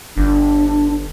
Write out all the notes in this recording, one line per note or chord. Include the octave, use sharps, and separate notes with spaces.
G1 D4